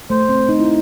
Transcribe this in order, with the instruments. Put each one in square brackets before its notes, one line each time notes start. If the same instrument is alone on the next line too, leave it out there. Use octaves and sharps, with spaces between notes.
[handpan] A3 [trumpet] C5
[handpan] C4
D#4
E4